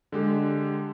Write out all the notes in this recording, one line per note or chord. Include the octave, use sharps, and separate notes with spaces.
D3 G#3 G4